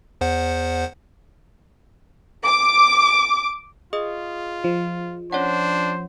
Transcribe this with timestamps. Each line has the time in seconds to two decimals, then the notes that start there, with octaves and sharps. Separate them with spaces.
0.21 E2 C5 F#5
2.45 D6
3.93 F4 G#4 D#5 D#6
4.64 F3
5.32 C#4 D4 C5 C#5 F#5